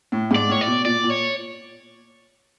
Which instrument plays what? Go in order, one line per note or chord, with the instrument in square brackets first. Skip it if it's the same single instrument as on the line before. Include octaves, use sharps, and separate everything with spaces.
[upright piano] A2
G#2
[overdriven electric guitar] D5
[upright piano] A2 [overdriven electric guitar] C#5
[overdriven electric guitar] D5
[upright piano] B2
[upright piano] A#2 [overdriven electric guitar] D5
[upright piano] A#2
[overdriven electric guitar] C#5